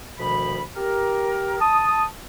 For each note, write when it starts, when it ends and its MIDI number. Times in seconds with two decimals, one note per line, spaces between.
0.19 0.61 38
0.19 0.61 47
0.19 0.61 51
0.19 0.61 53
0.19 0.61 83
0.76 1.59 67
0.76 1.59 70
1.60 2.04 81
1.60 2.04 87